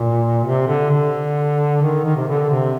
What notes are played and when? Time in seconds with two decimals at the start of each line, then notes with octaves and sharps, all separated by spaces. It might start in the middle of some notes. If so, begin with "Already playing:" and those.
Already playing: A#2
0.44 C3
0.67 D3
0.91 D3
1.82 D#3
2.04 D#3
2.16 C3
2.27 D3
2.50 C3